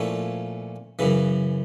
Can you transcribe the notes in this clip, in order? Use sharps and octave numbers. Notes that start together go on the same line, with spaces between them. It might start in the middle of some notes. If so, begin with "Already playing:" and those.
Already playing: A#2 F3 A3 C#4 E4
F#2 C#3 E3